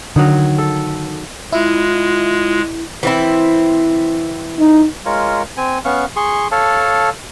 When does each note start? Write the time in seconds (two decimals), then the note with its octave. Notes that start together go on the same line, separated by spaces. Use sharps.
0.16 D3 D#3 F#3
0.58 A4
1.53 G#3 E4 F4
3.03 E3 C4 E4
4.59 D#4
5.05 G#3 F4 A#4 C#5
5.57 C4 G#5
5.85 B3 C#4 F5 C#6
6.16 G#4 C6 C#6
6.52 A4 C#5 F5 A5